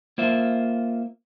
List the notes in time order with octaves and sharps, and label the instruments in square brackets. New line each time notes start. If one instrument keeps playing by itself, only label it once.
[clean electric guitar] A#3 F4 C5 E5